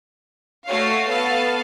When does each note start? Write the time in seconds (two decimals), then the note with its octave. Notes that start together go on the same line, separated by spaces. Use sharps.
0.66 A3 F#4 C#5 F5 C7
1.08 B3 A4 F5 A5